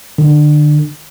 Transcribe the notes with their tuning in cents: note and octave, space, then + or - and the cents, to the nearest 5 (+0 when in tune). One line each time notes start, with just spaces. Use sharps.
D3 +30